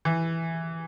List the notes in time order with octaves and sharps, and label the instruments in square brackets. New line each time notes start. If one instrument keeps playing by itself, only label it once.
[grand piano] E3